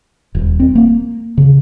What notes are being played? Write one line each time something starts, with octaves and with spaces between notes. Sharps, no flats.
D#1
C4
A#3
C#3